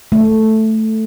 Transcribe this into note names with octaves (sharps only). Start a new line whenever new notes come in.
A3